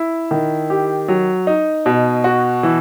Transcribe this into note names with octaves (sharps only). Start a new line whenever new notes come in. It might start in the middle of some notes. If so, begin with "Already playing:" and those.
Already playing: E4
D#3
G4
F#3
D#4
B2
F#4
E3